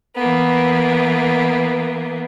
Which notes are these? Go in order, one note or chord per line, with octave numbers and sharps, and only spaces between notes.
E3 A#3 B3